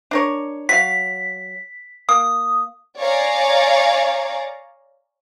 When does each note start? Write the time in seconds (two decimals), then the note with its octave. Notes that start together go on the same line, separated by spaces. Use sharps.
0.11 D4 A#4 C#5
0.69 F#3 F5 B6
2.09 A#3 D#6
2.98 C#5 D5 F5 G#5 A#5